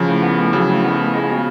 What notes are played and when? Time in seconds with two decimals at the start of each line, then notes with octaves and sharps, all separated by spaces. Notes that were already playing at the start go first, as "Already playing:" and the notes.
Already playing: C#3 F3
0.08 A2
0.22 B3
0.38 A2
0.53 C#3 F#3
0.69 A2
0.84 B3
0.99 A2
1.14 G#3
1.30 B2